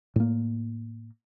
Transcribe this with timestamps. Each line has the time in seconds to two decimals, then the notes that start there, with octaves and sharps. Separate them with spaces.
0.16 A2 A#3